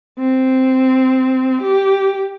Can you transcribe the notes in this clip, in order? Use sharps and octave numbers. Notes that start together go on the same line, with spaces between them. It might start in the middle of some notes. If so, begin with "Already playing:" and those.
C4
G4